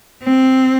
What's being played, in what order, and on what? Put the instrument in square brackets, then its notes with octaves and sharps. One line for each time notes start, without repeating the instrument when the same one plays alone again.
[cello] C4